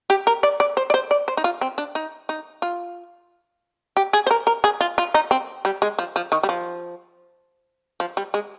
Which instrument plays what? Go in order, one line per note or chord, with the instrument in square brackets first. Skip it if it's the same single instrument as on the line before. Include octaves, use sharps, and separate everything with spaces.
[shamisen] G4
A#4
D5
D5
C5
D5
C5
D5
C5
D#4
F4
C4
D4
D#4
D#4
F4
G4
G#4
C5
A#4
A#4
G#4
F4
F4
D#4
C4
G3
G#3
F3
F3
D#3
G3
F3
F3
G3
G#3